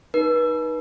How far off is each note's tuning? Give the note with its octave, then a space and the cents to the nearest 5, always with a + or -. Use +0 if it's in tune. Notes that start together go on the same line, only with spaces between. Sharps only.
D#4 +0 B4 -35